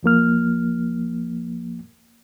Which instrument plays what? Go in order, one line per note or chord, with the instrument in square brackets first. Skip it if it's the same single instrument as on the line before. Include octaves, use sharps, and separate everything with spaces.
[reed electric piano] E2 F3 A#3 F6